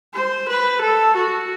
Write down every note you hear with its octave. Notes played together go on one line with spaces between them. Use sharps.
C5
B4
A4
F#4